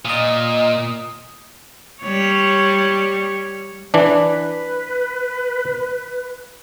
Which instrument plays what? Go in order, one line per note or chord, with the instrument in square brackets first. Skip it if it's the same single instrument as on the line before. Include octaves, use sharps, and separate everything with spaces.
[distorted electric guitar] A#2 [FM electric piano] D#5 D#6
[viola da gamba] G3 C#5
[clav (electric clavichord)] E3 D4 [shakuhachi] B4